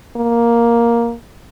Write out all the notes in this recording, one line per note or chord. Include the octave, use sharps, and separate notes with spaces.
A#3